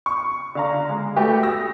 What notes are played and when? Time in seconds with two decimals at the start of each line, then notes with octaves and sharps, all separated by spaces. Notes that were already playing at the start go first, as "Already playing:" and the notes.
0.06 C#6
0.55 D3 F5 A#5
0.89 G#3
1.16 A3 F#4 G4 B4
1.43 D#6 E6 A#6